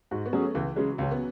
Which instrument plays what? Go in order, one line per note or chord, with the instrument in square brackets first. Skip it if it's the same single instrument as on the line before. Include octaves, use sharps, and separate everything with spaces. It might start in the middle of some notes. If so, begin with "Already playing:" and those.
[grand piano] G#2 [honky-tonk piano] F#4
[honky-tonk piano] B3
[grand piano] F#3 C#4 G#4
[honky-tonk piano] A3
[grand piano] C#2 [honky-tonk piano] E3
[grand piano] C#3 G#3 [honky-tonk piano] F#3
[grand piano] C#2 [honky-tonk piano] C#4
[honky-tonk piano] B3